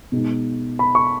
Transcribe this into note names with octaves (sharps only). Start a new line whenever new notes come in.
B2 G#3 D#4
B5
C#6